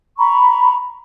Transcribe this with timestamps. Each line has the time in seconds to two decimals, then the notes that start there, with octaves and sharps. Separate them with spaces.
0.18 A#5 B5 C#6